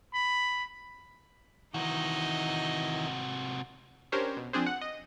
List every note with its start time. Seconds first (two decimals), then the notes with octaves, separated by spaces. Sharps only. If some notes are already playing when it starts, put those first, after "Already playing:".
0.14 B5
1.74 C3 D#3 E3 D#4 F#4 D#5
4.12 C#4 D4 G4 A#4 C5 C#5
4.37 B2
4.53 F3 C4 D4 G#4 C5
4.66 F#5
4.81 D#5